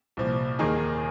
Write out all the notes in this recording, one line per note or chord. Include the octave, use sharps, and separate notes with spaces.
C2 A#2 F3
D#2 D#3 A#3 D#4 G#4